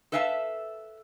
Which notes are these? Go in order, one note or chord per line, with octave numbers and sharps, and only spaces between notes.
A4 B4 E5 F5 G5 A5